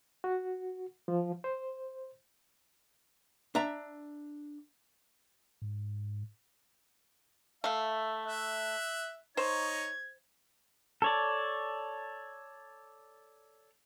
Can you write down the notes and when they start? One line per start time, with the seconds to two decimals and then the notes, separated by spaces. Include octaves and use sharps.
0.24 F#4
1.08 F3
1.44 C5
3.55 D4 E5 A#5
5.62 G#2
7.64 A3 E5 F5
8.27 E5 F#6
9.37 D#4 C5 C#5 G#6
11.02 A4 C#5 D5